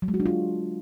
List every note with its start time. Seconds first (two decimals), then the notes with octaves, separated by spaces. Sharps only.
0.02 F#3
0.08 G#3
0.14 F#4
0.20 D4
0.26 F4